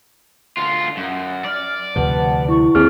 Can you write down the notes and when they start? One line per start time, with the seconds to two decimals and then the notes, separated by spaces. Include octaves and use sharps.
0.57 D2 F4
0.97 F#2
1.45 D5 F6
1.96 D2 C3 F3 B4 F#5 A5
2.49 E4 C#6
2.75 D#2 C4 G#4 D5 F6